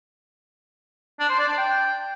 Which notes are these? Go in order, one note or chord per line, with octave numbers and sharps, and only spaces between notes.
D4
C5
D5
D4
G5